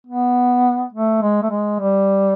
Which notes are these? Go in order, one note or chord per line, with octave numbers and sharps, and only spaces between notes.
B3
A3
G#3
A3
G#3
G3